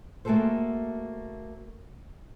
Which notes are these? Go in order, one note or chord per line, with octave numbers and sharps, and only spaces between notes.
A3 A#3 F#4 G#4 A4 C5